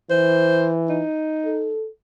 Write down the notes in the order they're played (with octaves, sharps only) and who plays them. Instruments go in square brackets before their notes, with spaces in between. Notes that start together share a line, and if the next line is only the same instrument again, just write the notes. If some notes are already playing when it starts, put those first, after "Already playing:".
[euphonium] E3 [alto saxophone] C5
[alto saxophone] D#4
[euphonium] A4